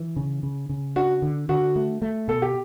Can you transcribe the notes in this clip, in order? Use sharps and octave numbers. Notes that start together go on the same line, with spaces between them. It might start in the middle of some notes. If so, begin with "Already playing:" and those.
Already playing: E3
C#3
C#3
C#3
D4 F#4
D3
D3 F#4
A3
A3
B2 A4
G4